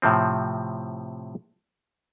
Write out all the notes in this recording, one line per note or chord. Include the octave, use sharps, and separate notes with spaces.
A2 C3 F3 C4